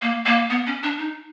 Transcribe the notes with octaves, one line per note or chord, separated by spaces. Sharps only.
A#3
A#3
B3
C#4
D4
D#4